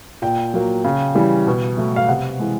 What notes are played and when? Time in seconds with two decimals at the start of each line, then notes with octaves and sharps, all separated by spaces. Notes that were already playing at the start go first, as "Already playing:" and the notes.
0.22 A#2 G5
0.54 F#3 A#3
0.84 C#3
1.15 E3 G3
1.47 B2
1.77 F#3 A3
1.96 F5
2.08 C3 F#5
2.39 E3 G#3